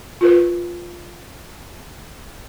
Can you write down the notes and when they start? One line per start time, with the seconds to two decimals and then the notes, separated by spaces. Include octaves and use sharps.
0.21 F4 A#4 B4